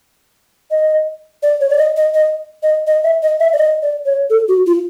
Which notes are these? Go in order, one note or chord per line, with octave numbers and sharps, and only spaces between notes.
D#5
D5
C#5
D5
D#5
D#5
D#5
D#5
D#5
E5
D#5
E5
D5
D#5
D5
C#5
A4
F#4
F4